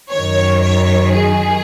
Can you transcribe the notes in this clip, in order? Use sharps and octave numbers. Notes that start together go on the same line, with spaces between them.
F#2 D#3 C#5
C#5
G#4